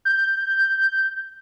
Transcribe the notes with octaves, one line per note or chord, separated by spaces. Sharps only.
G6